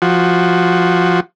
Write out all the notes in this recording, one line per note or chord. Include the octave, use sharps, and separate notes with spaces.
F3 F#4